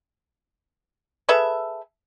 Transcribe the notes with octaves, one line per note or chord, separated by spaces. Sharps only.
G#4 A4 B4 E5